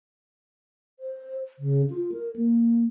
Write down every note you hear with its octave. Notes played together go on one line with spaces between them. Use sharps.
C5
C#3
F4
A#4
A#3